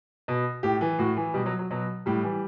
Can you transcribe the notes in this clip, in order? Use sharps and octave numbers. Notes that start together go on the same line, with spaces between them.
B2
A2 G4
E3
A2 F#4
E3
B2 G3
F#3
F#3
B2 F#3
A2 G3
E3